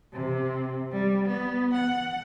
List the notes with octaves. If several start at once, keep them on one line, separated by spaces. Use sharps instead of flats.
C3
G3
B3
F#5